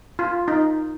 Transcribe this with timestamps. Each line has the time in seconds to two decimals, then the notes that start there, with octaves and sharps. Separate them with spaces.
0.19 F4
0.48 D#4